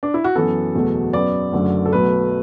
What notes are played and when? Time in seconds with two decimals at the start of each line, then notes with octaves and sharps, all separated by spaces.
0.03 D4
0.14 E4
0.24 F#4
0.36 F#2 E3 B3 A4
0.75 F#1 E2 B2 F#3 A3
1.13 F#2 F#3 B3 D5
1.52 F#1 F#2 D3 A3
1.86 A4
1.92 B1 B2 F#3 A3 B4